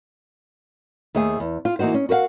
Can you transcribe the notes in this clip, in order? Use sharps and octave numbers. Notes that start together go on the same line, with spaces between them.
D#2 A3 G#4 F5 G#5
E2
F4
E3 A#3 D#4 F#4 C5
C#4
F#4 A#4 B4 F5 F#5